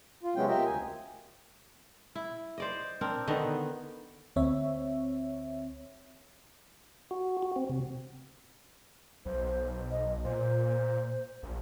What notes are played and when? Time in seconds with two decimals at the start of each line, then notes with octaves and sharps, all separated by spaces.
0.23 F4
0.36 C3 F#3 G#3 B3 C#4 G5
0.48 F4 G4 A#4 D#5 E5 G5
0.66 D2 G#5
2.15 E4
2.58 C5 D5 D#5
3.01 C4 D4 A#4
3.27 D3 D#3 B3 D#5
4.36 D2 C4 C#5 E5
7.11 F#4
7.43 F#4
7.56 C4
7.70 C3
9.25 B1 C5
9.91 D#5
10.24 A#2 C5
11.43 A#1